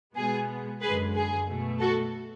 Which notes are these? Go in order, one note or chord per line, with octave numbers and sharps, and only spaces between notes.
B2 G#3 B3 G#4
F#2 D3 G#3 G#4 B4
G#4
B2 A3
F#4 A4